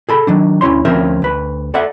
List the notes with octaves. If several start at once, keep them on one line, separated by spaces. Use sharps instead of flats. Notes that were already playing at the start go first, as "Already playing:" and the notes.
G#4 A4 B5
D#3 F#3 D4
D2 C#4 E4 C#5 C6
D2 F3 C4 C#4 A#4 E5
D2 B4
A4 D5 E5 F#5